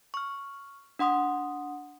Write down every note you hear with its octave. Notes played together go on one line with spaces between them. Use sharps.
C#6 F6
D4 F#5 C6 D#6